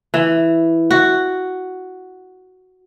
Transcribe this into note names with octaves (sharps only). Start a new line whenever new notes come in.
E3
F#4